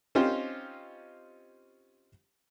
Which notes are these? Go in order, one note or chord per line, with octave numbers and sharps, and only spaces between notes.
C4 C#4 D#4 F4 G4 C5